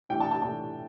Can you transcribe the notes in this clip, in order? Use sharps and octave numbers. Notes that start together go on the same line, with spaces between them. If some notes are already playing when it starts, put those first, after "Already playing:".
A2 E3 A3 D4 G5
A5
A5
A2 E3 A3 D4 A5